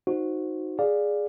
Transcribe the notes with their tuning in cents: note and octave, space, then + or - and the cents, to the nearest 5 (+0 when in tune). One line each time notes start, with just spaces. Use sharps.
D#4 +0 F#4 -10 C5 +0
G#4 +0 D5 +0 F5 +5